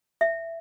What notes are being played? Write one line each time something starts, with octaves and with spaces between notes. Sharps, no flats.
E5